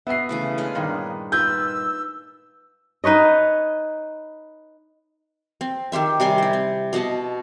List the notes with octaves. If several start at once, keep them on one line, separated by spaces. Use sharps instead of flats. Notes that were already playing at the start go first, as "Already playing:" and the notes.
B2 B3 E5 C7
C#3 E3 A3
G#3 D4 C#5 F5
G2 A#2 D#3
D#4 F4 B4 E6 G6
D#4 B4 C#5 D#5
C4
D#3 G4 C5 E5
C3 G3 G#5 C6
E4 C5
C4
B2 D#5 F#5 A5